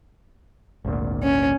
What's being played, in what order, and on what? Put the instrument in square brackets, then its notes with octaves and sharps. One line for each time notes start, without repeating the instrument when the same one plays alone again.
[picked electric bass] G#1 D2 A#2
[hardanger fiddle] C#4